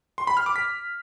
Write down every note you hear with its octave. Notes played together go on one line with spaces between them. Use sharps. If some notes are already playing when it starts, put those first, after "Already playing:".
C6
B5
F6
D6
B6